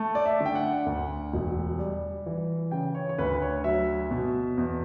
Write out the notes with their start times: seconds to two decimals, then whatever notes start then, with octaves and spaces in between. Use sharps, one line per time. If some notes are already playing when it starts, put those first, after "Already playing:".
Already playing: A3
0.15 D5
0.26 E5
0.40 D3
0.46 G5
0.55 F#5
0.86 D2
1.33 E1
1.79 G3
2.26 E3
2.71 C#3 G5
2.95 C#5
3.09 C#5
3.19 D2 B4
3.42 C#5
3.64 F#3 E5
4.11 B2
4.58 E2